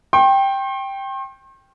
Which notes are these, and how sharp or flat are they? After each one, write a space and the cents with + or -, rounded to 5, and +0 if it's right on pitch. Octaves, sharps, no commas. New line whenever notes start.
G5 +0 C6 +45